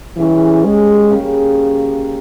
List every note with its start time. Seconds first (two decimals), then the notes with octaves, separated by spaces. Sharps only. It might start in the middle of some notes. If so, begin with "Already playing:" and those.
0.17 C#3 E3 G3 C#4
0.65 G#3
1.11 C#3 G3 A#3